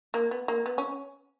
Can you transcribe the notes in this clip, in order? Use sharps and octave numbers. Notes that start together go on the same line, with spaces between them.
A#3
B3
A#3
B3
C#4